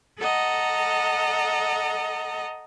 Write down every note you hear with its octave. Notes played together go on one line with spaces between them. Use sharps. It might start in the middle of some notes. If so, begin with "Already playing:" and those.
A4 D#5 F#5 A#5